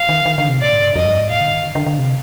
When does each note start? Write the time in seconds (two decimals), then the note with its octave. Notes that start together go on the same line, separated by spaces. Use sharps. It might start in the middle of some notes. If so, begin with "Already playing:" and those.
Already playing: F5
0.09 D#3
0.25 D#3
0.38 D3
0.48 C3
0.61 A#2 D5
0.73 G#2
0.83 G2
0.95 F2 D#5
1.06 G2
1.19 G#2
1.30 A#2 F5
1.40 D3
1.53 D#3
1.65 D3
1.75 D3
1.86 D3
1.99 C3